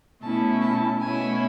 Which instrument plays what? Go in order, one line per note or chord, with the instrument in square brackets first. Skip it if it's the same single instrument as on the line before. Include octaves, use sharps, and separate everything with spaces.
[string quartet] B2 A3 C#4 E4 A5
A5
B2 A3 C#4 E4 G#5